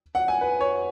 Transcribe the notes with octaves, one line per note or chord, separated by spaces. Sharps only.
F#5
G#5
B4
C#5